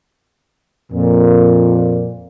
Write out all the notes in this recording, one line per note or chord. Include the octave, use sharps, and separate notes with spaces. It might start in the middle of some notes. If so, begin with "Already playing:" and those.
F2 A#2